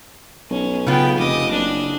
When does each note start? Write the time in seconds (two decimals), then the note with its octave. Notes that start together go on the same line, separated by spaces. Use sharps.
0.51 B1 C#4
0.87 C#3 B3 F4 G5
1.19 F1 D#5 D6
1.51 F#1 D4